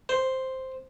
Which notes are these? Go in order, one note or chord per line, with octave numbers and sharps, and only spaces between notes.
C5